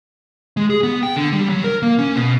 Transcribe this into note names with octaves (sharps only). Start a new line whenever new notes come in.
G#3
G#4
B3
G5
D3
G3
F#3
A#4
A#3
C#4
B2